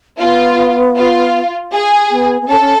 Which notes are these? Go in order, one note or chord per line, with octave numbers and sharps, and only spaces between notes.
B3 F4
F4
G#4
B3
B3
C#4 A4
C#4